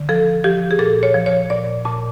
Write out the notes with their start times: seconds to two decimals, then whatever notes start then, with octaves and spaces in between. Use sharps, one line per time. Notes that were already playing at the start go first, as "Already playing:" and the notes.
Already playing: D3
0.09 F3 A4
0.44 F3 G4
0.71 G#4
0.79 A#2 A4
1.03 C#5
1.14 F3
1.26 C#5
1.50 A#2 D5
1.85 A#2 A5